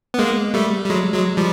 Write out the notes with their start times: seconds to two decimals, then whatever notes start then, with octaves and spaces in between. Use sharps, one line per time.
0.14 B3
0.19 G#3 A#3
0.54 G3 A3
0.85 G3
0.90 F#3 G#3
1.14 F#3 G#3
1.37 F3 G3